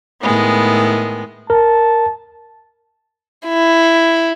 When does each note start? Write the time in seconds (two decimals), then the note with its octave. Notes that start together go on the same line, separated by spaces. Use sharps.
0.20 A2 D#3 G#3 B3
1.50 A#4 A5
3.48 E4